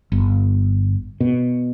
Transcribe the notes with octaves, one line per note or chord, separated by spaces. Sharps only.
G1
B2